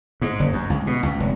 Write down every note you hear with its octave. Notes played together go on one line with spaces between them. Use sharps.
G#2
F#1
F#2
C#2
B2
C#2
F1